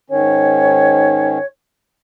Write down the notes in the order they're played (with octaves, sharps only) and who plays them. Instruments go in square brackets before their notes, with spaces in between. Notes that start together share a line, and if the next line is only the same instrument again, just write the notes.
[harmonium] G#2 D#3 C#4 [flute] C#5